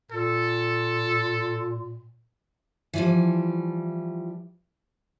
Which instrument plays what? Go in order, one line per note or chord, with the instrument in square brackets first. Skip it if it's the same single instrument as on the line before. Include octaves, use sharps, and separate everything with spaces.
[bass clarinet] A#2 [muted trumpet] A4
[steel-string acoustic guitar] E3 F3 G3